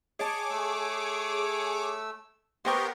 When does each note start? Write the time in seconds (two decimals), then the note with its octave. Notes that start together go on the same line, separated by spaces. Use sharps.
0.19 G#4 C#5 D#5 A5 D6
0.50 A3 E6
2.65 B3 G4 A#4 C5 D#5 G5 C6 C#6